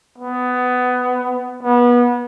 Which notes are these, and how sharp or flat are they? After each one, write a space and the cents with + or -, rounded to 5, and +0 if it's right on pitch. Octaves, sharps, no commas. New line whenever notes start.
B3 +15
B3 -25